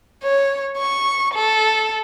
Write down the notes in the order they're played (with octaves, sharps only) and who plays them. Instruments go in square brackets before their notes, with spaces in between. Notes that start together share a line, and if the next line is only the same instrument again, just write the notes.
[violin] C#5
C#6
A4